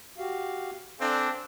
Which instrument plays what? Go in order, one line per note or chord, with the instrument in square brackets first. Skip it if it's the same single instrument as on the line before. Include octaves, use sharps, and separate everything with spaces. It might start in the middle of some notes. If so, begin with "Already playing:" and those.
[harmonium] F#4 G4 F5
[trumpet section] C4 D4 [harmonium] A4 F5 G#5